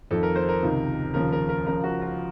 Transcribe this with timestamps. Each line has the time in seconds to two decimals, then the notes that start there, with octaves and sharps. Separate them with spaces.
0.11 F2 D#3 A4
0.23 A#4
0.36 C5
0.49 A#4
0.63 C#2 C3 D#3
1.14 D#2 C#3 F3 A#4
1.32 A#4
1.49 A#4
1.66 C#2 C#3 F3 A#4
1.84 F#4
2.02 F4